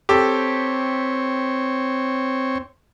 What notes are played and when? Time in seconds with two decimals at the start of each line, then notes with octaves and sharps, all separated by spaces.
0.09 C4 G4 A4 C#5